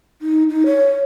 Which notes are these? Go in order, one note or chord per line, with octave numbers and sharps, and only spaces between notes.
D#4
D#4
C#5